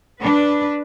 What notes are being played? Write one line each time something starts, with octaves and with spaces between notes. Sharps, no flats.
D4 B4